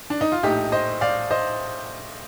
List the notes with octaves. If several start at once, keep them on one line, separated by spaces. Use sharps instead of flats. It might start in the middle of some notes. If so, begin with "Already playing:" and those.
D4
D#4
F4
A#1 A2 D#4 G4
C5 D#5
D5 F5
C5 D#5